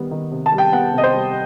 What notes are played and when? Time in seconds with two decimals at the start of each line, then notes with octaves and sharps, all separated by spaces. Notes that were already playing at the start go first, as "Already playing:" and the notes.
Already playing: D#3 G3 B3
0.11 D#3
0.31 C3
0.46 A5
0.52 G3
0.58 G5
0.72 B3 F#5
0.93 C3
0.98 D#5
1.04 C5
1.13 G3